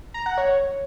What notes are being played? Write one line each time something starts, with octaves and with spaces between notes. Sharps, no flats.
A#5
F#5
C#5